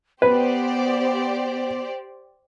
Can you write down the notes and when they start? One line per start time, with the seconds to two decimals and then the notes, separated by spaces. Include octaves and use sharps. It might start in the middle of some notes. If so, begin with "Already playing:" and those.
0.22 B3 G4 B4 C5 D5